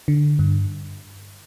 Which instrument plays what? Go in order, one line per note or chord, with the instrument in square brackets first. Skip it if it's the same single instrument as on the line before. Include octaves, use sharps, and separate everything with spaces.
[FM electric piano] D3
G2